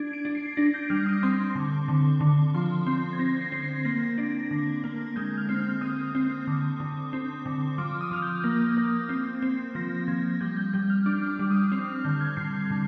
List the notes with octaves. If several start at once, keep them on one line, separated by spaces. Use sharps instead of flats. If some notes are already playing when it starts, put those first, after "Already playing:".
Already playing: D4 G#6
D7
D4
C7
D4 A#6
G6
G3 F6
D#6
C4 C6
D3
D3
D3
F3 C6
C4 C6
G#6
C4 A#6
C7
C4
C7
A#3 A#6
D4
D3
A#3
G#3 G6
F6
C4
F6
C4 D#6
C4
D3
D3
C4
D3
F3 D6
D#6
F3 F6
G6
A#3
A#3
C4
C4
F3 A#6
F3 G#6
G3 G6
G6
G3 G6
F6
D4 D6
D6
G3
D#6
C4 F6
F6
D3 G6
G#6
D3 C7
D3